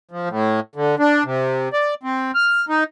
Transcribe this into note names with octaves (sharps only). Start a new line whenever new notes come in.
F3
A2
D3
D4
C3
D5
C4
F6
D#4